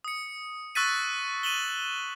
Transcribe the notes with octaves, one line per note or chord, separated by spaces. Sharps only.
D#6 C#7
C#6 E6 F#6 A6 B6 D#7
D#7 E7 F#7 G7